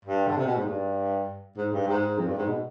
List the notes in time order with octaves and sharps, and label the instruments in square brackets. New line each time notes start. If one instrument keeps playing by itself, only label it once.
[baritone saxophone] G2
D3
C3
B2
G#2
G2
G#2
G2
G#2
F2
G2
G#2
B2